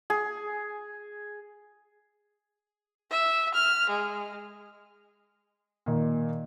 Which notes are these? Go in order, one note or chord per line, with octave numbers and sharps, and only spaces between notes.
G#4
E5
F6
G#3
A#2 D#3